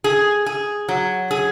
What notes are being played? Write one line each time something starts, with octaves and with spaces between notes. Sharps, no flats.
G#4
G#4
F#3
G#4